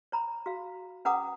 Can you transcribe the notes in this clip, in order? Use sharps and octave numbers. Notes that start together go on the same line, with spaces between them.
C#5 A#5 B5
F#4 F5
C#4 B4 F#5 A#5 D6 D#6